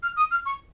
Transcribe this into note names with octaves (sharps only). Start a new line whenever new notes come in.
F6
D#6
F6
C#6